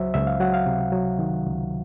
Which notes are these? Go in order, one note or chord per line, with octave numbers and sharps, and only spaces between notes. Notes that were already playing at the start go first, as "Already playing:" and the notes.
Already playing: C#2 F#3 C5 E5
C#2 E5
F5
F#3 F#5
F5
C3
F#3
D#3
C#2